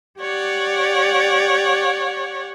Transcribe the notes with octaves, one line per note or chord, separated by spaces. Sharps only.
G4 C#5 D5 F#5